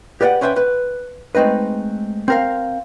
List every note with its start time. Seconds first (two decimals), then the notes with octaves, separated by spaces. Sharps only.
0.21 G4 B4 D5 E5 F#5
0.41 C#4 B4 C5 E5 F#5 G5
0.56 B4
1.35 G#3 A3 C4 D#4 B4
2.28 C4 A#4 F5